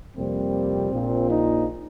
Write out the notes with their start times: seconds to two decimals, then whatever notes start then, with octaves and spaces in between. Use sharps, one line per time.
0.15 F2 C3 G3 A#3 C4
0.91 A#1 A#2 F3
1.28 D#4